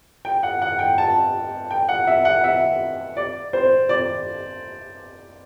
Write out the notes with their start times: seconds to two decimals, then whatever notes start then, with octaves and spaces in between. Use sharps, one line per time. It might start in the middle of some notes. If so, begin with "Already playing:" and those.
0.25 G5
0.43 F#5
0.62 F#5
0.79 G5
0.98 A5
1.71 G5
1.89 F#5
2.07 E5
2.25 F#5
2.44 E5
3.17 D5
3.53 C5
3.89 D5